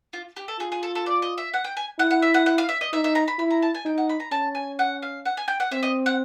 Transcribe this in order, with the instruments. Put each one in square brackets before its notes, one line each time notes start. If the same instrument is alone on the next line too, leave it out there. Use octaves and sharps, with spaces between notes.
[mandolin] F4
G4
A4
[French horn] F4 [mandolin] G#4
[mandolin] G#4
A4
A4
D5
D#5
E5
F#5
G5
G#5
[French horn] E4 [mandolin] F#5
[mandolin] F#5
E5
F#5
F#5
F5
E5
D#5
[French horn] D#4 [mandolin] E5
[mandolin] E5
A#5
B5
[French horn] E4 [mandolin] B5
[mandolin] A#5
A5
G#5
[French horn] D#4 [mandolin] G5
[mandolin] F#5
B5
A#5
[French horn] C#4 [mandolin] A5
[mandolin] G#5
F#5
F5
F#5
G#5
G5
F#5
[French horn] C4 [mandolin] E5
[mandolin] D#5
F#5